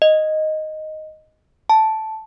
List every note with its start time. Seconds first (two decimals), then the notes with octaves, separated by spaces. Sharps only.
0.02 D#5
1.70 A5